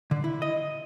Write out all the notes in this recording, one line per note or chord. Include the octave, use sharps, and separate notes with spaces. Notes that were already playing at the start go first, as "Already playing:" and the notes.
D3
E4
D#5